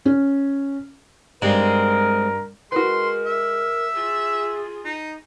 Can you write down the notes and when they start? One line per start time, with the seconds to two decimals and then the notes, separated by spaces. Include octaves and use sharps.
0.05 C#4
1.42 G2 G#3 C4 A#4
2.72 G#3 F#4 A#4 B4 C6
3.26 E5
3.96 F4 G#4
4.85 D#4